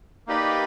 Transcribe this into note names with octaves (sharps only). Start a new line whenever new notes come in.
A#3 D#4 G4 B4 D5